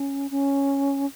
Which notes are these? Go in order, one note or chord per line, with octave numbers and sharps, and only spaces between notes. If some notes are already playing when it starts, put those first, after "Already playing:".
Already playing: C#4
C#4